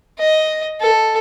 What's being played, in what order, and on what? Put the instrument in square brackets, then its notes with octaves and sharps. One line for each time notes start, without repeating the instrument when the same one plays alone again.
[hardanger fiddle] D#5
A4